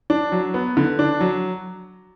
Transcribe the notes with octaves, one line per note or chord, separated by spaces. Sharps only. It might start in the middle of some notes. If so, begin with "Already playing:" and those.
D4
F#3
B3
D3
D4
F#3